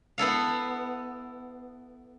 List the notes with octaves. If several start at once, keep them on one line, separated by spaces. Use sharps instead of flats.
B3 E4 A4 F5